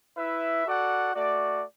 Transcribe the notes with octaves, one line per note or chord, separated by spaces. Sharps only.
E4 B4 E5
F#4 A4 D5 F#5
A3 F#4 D5